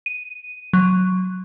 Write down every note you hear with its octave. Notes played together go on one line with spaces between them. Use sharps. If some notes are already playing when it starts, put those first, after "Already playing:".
D#7
F#3